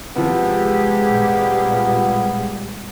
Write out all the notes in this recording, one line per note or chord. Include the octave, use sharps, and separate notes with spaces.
C3 F3 G#3 B3 G4 G#4
A#2 G3